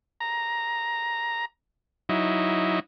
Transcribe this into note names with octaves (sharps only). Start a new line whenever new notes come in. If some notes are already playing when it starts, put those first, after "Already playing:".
A#5
F#3 D#4 E4